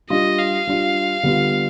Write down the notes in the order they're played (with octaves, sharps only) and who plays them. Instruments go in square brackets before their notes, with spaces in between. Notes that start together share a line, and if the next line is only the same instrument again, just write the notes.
[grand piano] G3 D4 F4 [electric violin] D#5
[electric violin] F5
[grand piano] G3 D4 F4
D3 G3 B3 F4